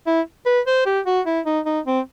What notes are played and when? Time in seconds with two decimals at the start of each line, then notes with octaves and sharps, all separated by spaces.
0.07 E4
0.46 B4
0.67 C5
0.86 G4
1.06 F#4
1.26 E4
1.46 D#4
1.66 D#4
1.86 C4